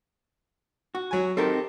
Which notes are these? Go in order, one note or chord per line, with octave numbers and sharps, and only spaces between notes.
F#4
F#3 G#5
C4 D#4 G4 A4 A#4